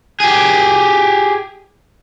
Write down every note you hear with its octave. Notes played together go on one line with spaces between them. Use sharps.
G4 G#4